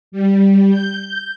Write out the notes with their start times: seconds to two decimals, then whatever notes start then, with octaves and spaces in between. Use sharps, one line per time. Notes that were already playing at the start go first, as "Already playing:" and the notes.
0.12 G3
0.69 G6